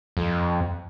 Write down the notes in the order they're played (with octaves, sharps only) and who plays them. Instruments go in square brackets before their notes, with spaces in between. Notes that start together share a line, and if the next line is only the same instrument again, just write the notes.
[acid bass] F2